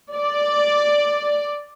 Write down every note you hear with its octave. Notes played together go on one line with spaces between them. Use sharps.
D5